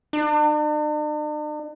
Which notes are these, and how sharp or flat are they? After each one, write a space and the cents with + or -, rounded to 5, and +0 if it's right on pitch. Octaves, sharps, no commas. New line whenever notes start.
D4 +45